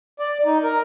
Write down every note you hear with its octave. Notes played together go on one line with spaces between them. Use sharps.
D5
D#4
A#4